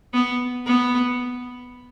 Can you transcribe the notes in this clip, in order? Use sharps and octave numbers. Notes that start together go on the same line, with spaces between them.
B3
B3